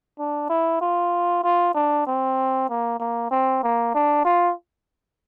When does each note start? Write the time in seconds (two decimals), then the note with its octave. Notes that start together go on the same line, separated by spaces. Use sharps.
0.19 D4
0.49 E4
0.81 F4
1.43 F4
1.74 D4
2.07 C4
2.69 A#3
3.00 A#3
3.31 C4
3.63 A#3
3.94 D4
4.25 F4